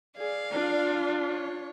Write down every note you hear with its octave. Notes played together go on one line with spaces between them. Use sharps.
G#4 D5 F5
D4 F4
C#5